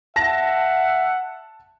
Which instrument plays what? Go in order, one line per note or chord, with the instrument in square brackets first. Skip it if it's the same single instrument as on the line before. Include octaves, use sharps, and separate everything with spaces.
[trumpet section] E5 F#5 [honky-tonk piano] A5 A#6